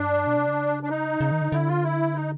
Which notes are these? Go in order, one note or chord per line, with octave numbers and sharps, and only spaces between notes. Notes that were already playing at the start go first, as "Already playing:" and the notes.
Already playing: G2 D4
B2
C3
C#3
D4
D#4
C#3
D#3
D3
D3 E4
F4
E4
D#4